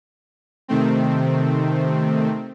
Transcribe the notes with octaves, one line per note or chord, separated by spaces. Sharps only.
C3 D#3 A3 C4